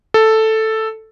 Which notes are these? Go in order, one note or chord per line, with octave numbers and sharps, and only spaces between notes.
A4